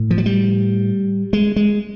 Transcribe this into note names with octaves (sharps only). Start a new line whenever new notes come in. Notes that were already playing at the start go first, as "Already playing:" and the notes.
Already playing: A2
F3
F#3
G3
G#3
G#3